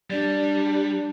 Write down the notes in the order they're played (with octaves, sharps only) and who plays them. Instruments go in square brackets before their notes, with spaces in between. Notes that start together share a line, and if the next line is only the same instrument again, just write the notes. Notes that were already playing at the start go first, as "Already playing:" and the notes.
[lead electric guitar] G3 [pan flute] D4 [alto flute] D5